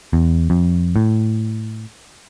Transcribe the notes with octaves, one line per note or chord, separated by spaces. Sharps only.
E2
F2
A2